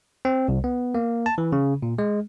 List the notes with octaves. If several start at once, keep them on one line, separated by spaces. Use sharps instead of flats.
C4
C2
B3
A#3
A5
E3
C#3
A#2
G#3